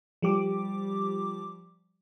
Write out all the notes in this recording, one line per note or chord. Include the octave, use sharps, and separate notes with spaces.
F3 G3 G4 D6